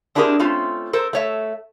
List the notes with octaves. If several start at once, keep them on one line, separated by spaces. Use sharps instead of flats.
C4 D4 E4 G4 G#4 A#4
A3 C4 C#4 F4
A4 A#4 C5
A3 C#5 E5